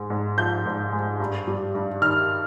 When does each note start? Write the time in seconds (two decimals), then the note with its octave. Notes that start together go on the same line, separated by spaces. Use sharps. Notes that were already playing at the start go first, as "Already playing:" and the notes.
Already playing: G#2 G#3
0.10 G#2
0.37 F3 G6
0.66 G#2
0.93 G#3
1.20 G2
1.47 G3
1.75 G2
2.02 D#3 F6